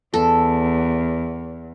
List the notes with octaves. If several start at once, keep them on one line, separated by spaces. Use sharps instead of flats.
E2 A4